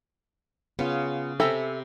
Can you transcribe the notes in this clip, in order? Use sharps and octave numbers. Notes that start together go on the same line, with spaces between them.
C#3 B3 F4
C3 A4 E5 G5 G#5 A#5 B5